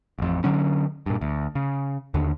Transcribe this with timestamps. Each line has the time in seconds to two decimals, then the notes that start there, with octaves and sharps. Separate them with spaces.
0.19 A1 F2
0.44 D3 F#3 C#4
1.06 G2 A#2
1.21 D2
1.55 C#3
2.14 D#2 D3